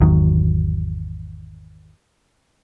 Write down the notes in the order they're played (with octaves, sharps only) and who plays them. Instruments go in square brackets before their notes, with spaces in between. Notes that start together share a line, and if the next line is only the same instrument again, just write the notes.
[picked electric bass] G#1 E2 D#3 F#3